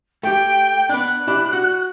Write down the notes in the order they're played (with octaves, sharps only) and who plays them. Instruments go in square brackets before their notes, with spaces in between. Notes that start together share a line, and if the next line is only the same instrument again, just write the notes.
[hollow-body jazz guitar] A3 G4 [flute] G5
[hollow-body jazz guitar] B3 D4 [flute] F#6
[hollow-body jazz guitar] D4 E4 G4
F#4